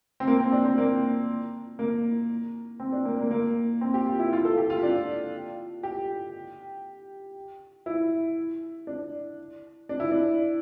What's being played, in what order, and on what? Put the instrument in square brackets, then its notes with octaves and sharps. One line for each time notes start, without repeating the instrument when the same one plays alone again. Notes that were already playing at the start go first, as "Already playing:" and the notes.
[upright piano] C4
A#3
C4
D4
C4
A#3
A#3
C4
D4
A#3
A#3
A#3
C4
G4
F4
E4
F4
A4
G4
F4
D4
G4
E4
D4
D4
E4
D4